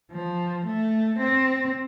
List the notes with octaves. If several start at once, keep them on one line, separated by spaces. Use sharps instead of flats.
F3
A3
C4